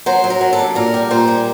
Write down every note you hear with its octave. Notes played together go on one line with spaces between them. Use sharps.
F#3 C5
F#3
A#4
F#3
A4
C3
A#2 A#4
G3
A#2 C5
G3